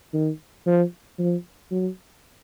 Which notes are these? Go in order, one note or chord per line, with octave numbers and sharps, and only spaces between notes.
D#3
F3
F3
F#3